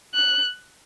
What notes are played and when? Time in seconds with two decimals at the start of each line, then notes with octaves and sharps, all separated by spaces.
0.15 F#6